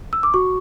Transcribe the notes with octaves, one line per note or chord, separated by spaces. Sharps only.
E6
D6
F#4 C#6